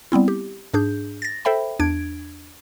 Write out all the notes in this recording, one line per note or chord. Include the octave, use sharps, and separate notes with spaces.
G3 B3 C4 E4
G4
G#2 D4 G#4 G6
A6 A#6
A4 C5 E5 G5 B5
E2 D4 G#6 D7